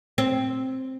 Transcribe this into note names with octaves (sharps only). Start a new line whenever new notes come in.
C4